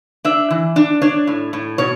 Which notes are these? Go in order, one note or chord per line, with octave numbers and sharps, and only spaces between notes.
D4 E5
E3
D4
D4 C#5
A2
A2
B2 C#5